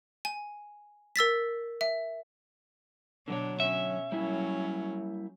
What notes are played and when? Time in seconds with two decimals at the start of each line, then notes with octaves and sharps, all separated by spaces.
0.25 G#5
1.16 A#4 E6 A6 B6
1.81 E5
3.28 B2 D3 F#3 D4 C#5
3.60 C#4 E5
4.12 F#3 G3 A#3 C#4 E4